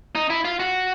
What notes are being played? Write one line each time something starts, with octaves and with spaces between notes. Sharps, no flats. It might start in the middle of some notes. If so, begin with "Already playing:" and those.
D#4
E4
F4
F#4